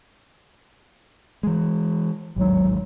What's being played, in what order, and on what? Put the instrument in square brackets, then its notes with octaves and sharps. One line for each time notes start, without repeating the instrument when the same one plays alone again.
[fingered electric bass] E3 G#3
[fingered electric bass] A1 D#2 G#2 [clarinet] F#3